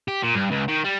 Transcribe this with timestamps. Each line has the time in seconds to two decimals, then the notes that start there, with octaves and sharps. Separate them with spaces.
0.08 G4
0.23 A#2
0.35 G2
0.51 C#2
0.68 D#3
0.85 G3